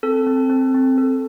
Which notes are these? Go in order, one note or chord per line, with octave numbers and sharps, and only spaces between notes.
C4 A4
C4
C4
C4
A4